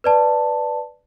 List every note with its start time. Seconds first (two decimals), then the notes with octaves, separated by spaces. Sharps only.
0.04 B4 D5 A5